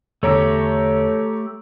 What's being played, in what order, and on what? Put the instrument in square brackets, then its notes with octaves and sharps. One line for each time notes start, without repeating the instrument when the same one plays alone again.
[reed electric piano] E2 D3 [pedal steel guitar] A3 G4 [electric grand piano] A4 C#5 A#5